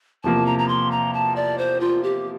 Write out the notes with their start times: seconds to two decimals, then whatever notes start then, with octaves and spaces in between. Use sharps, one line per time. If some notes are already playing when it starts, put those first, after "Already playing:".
0.24 E2 C3 F3 A#3 A5
0.46 A#5
0.59 A#5
0.68 C6
0.91 A#5
1.14 A5
1.36 D5
1.58 C5
1.80 F4
2.03 G4